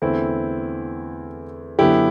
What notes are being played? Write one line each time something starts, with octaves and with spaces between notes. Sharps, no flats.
E2 D3 A3 C4 E4
F#2 D3 F#3 B3 E4 G4